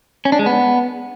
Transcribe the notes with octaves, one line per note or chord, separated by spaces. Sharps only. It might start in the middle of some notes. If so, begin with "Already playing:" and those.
C#4
D4
G#3
B3